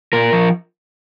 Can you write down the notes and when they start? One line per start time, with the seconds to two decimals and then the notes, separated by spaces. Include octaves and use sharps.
0.13 A#2 A#4
0.32 F3